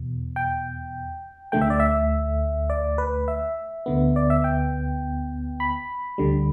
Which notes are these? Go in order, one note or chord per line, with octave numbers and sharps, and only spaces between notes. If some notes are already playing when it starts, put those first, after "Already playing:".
Already playing: E2 B2
G5
D2 D3 A3 G5
E5
D5
E5
D5
B4
E5
D2 D3 B3
D5
E5
G5
B5
D2 D3 G3